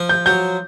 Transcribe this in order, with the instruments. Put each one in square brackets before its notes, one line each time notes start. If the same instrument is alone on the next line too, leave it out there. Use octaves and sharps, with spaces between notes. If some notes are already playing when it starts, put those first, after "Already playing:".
Already playing: [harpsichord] F3
[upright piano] G6
[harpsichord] F#3 [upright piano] G6